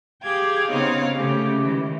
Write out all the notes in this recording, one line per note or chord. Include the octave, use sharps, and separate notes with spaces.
G4 G#4 F5 G5 G#6
C#3 B3 C4 D#4 C#5 F5
C#3 A3 C#4 G4
D#3 E3 G#3